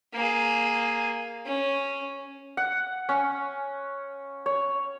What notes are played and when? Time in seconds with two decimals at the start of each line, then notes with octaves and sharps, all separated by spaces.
0.13 A#3 G#4
1.46 C#4
2.57 F#5
3.09 C#4
4.46 C#5